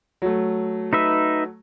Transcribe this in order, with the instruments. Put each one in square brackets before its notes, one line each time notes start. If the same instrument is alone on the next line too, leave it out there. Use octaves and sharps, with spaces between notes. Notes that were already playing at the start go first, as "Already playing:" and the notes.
[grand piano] F#3 A3
[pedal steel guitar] D#4 B4 E5